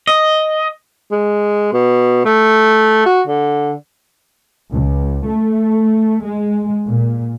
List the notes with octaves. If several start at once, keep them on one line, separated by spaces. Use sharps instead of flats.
D#5
G#3
B2
A3
F#4
D3
C#2
A3
G#3
A#2